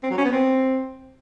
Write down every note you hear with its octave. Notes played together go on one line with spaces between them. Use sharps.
C4
F#3
C#4
B3
C4